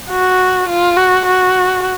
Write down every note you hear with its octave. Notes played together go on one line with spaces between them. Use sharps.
F#4
F4
F#4
F#4